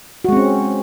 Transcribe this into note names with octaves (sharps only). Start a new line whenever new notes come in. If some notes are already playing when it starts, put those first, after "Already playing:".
G#3 C4 C#4 F#4